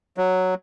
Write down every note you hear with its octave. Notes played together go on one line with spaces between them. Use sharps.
F#3